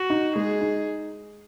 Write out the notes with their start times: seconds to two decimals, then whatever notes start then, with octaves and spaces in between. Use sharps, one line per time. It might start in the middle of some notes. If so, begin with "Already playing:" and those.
Already playing: F#4
0.10 D#4
0.36 G#3 G#4
0.61 D#4